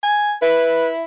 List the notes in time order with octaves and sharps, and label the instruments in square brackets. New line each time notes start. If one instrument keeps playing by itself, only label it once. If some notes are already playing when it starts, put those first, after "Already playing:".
[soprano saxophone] G#5
[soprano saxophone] E4 [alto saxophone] B4